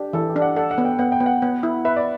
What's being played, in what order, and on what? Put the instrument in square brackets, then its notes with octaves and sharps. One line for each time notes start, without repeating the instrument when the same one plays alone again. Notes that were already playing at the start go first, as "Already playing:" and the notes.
Already playing: [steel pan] D4 [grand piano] G4
[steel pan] E3 [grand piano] A4
[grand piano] G4
[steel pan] D4
[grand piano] F#5
[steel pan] A4 [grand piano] F#5
[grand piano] F#5
[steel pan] B3
[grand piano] G5
[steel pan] B3 [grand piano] F#5
[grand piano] G5
[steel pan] B3
[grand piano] F#5
[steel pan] B3
E4
[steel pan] B4 [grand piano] E5
[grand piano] D5